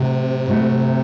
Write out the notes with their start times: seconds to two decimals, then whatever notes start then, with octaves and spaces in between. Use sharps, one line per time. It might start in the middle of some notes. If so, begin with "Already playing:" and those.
Already playing: A2 C3 F#3 A3
0.47 A2 F#3 A3